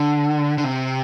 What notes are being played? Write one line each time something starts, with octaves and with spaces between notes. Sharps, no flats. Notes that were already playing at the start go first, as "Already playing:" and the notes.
Already playing: D3
D3
C3